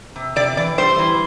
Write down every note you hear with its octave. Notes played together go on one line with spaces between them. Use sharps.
C3
C3 D5
E3 D5
G3 C5
E3